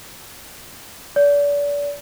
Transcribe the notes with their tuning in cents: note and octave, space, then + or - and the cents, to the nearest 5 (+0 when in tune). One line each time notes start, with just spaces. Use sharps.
D5 -35